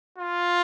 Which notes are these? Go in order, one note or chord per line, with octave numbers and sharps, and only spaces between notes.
F4